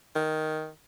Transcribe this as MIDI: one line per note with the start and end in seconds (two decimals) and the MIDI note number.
0.16 0.70 51